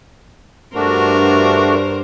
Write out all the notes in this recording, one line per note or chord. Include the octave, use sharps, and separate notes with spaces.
G2 A3 D4 F#4 A#4 C5